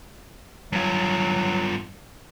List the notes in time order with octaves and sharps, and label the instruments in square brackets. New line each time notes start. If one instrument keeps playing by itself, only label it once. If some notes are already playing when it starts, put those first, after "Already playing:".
[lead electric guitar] G2 F4 [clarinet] F#3